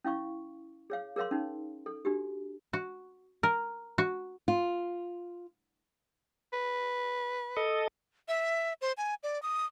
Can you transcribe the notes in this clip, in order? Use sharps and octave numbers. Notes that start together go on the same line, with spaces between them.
C#4 E4 F5 C#6
G#4 C#5 F5
G#4 A#4 C#5 F5 C6
C#4 D#4
A4
D4 F#4 G4
F#4
A#4
F#4
F4
B4
A4 D#5
E5
C5
G#5
D5
D#6